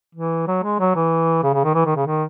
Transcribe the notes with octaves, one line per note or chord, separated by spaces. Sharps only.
E3
F#3
G#3
F#3
E3
C#3
C#3
D#3
E3
D#3
C#3
D#3